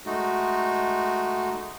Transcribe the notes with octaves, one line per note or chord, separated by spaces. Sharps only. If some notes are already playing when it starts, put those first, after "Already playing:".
G#3 A3 D#4 F#4